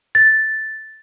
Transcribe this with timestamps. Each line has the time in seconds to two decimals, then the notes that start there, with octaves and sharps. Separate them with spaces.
0.15 A6